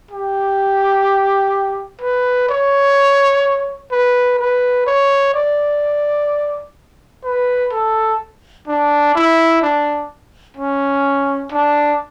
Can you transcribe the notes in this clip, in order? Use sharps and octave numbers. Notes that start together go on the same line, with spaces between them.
G4
B4
C#5
B4
B4
C#5
D5
B4
A4
D4
E4
D4
C#4
D4